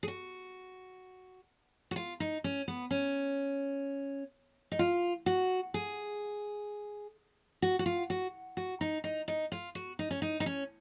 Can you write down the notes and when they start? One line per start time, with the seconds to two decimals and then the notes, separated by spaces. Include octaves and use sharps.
0.03 G#4
0.08 F#4
1.91 F#4
1.96 F4
2.20 D#4
2.44 C#4
2.68 B3
2.91 C#4
4.72 D#4
4.79 F4
5.26 F#4
5.74 G#4
7.62 F#4
7.79 F#4
7.86 F4
8.10 F#4
8.57 F#4
8.81 D#4
9.04 D#4
9.28 D#4
9.52 F4
9.75 F#4
9.99 D#4
10.11 C#4
10.22 D#4
10.40 D#4
10.46 C#4